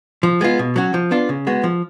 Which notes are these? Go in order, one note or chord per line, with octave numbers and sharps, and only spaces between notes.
F3
G#3 B3 F4
B2
F#3 C#4 F#4
F3
B3 D4 F4
C#3
G#3 B3 F#4
F3